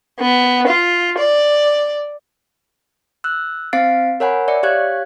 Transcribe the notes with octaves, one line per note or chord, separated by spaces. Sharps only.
B3
F4
D5
E6 F#6
C4 C5 F5 A6 C7 D7
A#4 C#5 F#5 G#5 B5
D5 E5 C#7
G4 C#5 F5 F#6 G#6